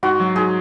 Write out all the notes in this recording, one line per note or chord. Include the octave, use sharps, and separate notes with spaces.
G#2 F#4
F#3
G#2 G#4